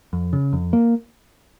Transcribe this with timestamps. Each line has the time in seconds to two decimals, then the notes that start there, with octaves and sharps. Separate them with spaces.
0.13 F2
0.33 C#3
0.53 F2
0.73 A#3